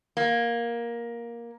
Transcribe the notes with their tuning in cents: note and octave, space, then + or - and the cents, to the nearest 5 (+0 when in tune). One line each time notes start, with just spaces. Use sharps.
A#3 +10